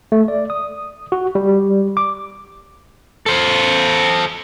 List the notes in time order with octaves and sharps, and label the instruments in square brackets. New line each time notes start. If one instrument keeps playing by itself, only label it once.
[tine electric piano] A3
D5
D#6
F#4
G3
D6
[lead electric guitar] A4 C5